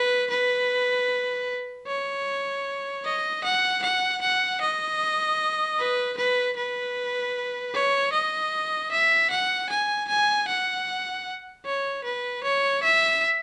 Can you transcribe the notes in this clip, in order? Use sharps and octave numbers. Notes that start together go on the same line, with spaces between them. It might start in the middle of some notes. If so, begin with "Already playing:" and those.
Already playing: B4
B4
C#5
D#5
F#5
F#5
F#5
D#5
B4
B4
B4
C#5
D#5
E5
F#5
G#5
G#5
F#5
C#5
B4
C#5
E5